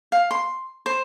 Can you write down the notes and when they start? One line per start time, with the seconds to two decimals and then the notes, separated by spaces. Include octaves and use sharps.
0.12 F5
0.31 C6
0.86 C5